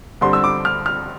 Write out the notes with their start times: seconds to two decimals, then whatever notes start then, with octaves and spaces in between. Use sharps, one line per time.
0.21 G2 D3 G3 C4 C6
0.33 E6
0.44 D6
0.65 F6
0.86 F6